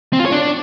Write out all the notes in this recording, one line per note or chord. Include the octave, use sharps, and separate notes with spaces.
C4
F4
C#5
D4